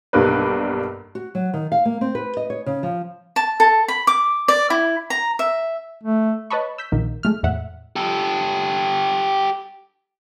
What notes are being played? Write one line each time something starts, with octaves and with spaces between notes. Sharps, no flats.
B1 G2 G3 A#3 B4
F#4
F#3
D#3
F5
A#3
C4
B4
D#5
C#5
C#3
F3
A5
A4
B5
D6
D5
E4
A#5
E5
A3
B4 C#5 D#5 A5 B5 C#6
E6 G6 B6
A#1 D#3 A#3
G#3 A3 F6
E2 A2 E5 F#5
G4 A4